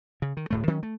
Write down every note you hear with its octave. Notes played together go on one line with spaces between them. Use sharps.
C#3
D#3
D1 A2 A3
D#3 F#3 C#4
A3